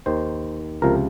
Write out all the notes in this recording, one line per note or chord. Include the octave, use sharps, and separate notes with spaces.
D#2 D#3 C5
C#2 C3 F3 A#4